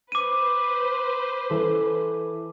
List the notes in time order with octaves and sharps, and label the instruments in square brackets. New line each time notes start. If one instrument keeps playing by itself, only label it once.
[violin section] B4 C5 [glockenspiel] D6 D#7
[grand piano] E3 A4